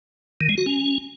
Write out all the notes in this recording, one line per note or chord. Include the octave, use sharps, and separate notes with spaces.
D#3
G#3
F#4
C#4